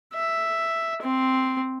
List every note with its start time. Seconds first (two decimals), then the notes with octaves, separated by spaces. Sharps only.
0.14 E5
1.02 C4